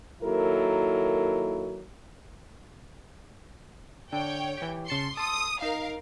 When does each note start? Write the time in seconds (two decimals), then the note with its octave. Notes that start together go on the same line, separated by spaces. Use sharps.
0.22 D#3 F#3 A#3 E4 A4 A#4
4.13 D3 C#5 G5
4.57 E3 G4
4.88 C#3 A5 C6 C#7
5.17 A4 C6 D#6
5.62 D#4 A#4 F5